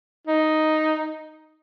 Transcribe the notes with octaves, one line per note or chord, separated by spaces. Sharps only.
D#4